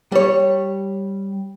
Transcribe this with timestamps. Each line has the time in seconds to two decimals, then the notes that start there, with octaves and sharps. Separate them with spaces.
0.12 G3 C#5